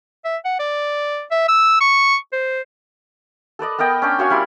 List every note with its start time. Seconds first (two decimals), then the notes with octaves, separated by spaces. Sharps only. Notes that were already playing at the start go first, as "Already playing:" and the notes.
0.25 E5
0.45 F#5
0.59 D5
1.31 E5
1.49 E6
1.81 C#6
2.33 C5
3.59 A4 B4 D5 D#5
3.78 B3 A#4 D#5 G5
4.02 C#4 D4 G5
4.19 F#4 C#5 F5 G#5
4.30 G3 E4 D5 C6